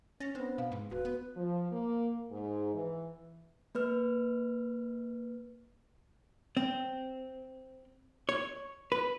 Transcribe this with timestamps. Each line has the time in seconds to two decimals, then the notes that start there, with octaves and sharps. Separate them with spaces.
0.20 C#4 A6 A#6
0.35 B3 C4 D4 C5
0.58 B2 F5
0.72 G#2
0.91 D1 F#4 B4
1.05 B3
1.36 F3
1.72 A#3
2.31 G#2
2.74 E3
3.75 A#3 B4 F6
6.57 C4
8.29 C#5
8.92 B4